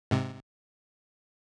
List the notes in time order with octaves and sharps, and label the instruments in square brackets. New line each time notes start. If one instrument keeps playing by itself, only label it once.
[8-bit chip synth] G#2 C3